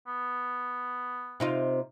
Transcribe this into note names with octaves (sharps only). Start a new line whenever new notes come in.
B3
C3 D#4 F4